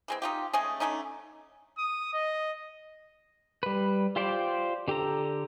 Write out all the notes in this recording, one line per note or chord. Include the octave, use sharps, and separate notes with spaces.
E3 G#3 C4
D#4 F4 G4
G#3 A3 C#4 G#4
D3 A3 C#4 D#4
D#6
D#5
G3 B4
F4 G4 C5 D5 G5
D3 G4 A4 A#5